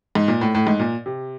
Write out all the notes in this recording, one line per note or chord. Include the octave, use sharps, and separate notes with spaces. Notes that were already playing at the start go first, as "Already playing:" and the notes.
G#2
A#2
A2
A2
G#2
A#2
C3